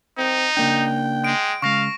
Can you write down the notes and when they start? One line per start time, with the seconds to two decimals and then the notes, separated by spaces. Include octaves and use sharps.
0.18 C4 D#4
0.57 C#3 A#3 D4 G5
1.24 G#3 D7
1.62 C#3 G#3 F5 C#6 A#6